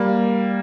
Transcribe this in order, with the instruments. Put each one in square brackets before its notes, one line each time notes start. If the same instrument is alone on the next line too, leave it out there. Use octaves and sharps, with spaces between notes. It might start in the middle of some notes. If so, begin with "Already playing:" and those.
Already playing: [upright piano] G3 A#3